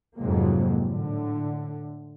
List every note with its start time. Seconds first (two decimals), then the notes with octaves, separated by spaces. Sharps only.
0.17 F2 G#2 C3 F#3 G#3 A#3
0.88 A2 D3